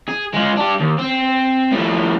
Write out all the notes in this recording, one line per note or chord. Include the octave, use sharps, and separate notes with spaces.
G#4
G#3 F4
D4 G4
D#2
C4
A2 F3